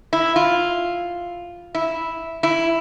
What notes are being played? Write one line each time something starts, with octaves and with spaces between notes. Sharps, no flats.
E4
F4
E4
E4